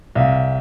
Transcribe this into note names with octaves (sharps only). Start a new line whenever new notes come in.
C2 F5